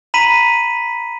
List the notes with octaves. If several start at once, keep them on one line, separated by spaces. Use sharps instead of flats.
A#5 B5 B6 D#7 F#7